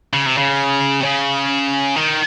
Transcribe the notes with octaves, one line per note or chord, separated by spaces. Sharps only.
C#3
C3
C#3
C3
C#3
D#3